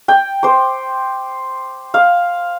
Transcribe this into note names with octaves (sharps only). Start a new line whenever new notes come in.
G5
C5 D6
F5